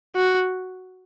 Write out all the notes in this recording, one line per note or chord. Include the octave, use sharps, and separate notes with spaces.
F#4